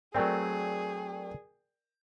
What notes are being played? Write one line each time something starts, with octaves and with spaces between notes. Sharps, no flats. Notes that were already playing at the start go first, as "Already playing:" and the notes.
F#3 A3 C4 G#4 A#4 D5 G5